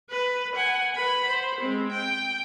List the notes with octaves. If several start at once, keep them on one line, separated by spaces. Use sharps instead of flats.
B4
F#5 G#5
B4 B5
C5
G#3 C4
G5